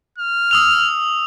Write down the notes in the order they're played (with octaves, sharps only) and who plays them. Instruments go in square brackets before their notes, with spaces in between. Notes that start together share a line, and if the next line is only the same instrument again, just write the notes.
[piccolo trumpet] F6
[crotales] D#6 E6 F7